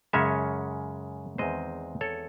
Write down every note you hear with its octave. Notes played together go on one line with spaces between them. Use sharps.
F#2 C#3 G#3 C#4 C#5 E5
E2 D#3 G#3 C4 C5 D#5
A4 C#5